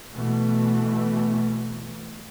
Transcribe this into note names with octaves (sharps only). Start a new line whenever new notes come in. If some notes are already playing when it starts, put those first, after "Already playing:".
B2 E3 A3